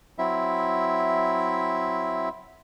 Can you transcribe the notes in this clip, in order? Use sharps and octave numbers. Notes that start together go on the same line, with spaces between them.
F#3 C4 E4 E5